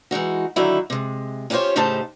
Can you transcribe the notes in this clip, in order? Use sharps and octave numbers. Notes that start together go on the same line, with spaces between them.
E3 G#3 D#4 F#4
D3 D#3 F#3 D#4 E4
C3 G#3
C#4 F4 G4 A4 C5 C#5
A2 C#3 D#4 G4 C5 A5